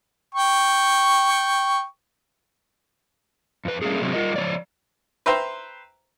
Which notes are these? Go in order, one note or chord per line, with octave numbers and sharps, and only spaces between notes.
G5 C#6
F2 B4
G3 A3 A#3 C#4 G#4
C3 F#3 G#3 A#3 C4
G3 F4 A#4 D#5
F3 G#3 C#5 D5
B4 C5 E5 G5 A#5 C6